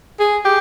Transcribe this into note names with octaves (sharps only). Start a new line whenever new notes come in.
G#4
G4